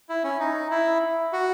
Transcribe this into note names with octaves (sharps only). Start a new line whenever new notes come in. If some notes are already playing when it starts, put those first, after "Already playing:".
E4
C#4
D#4
E4
F#4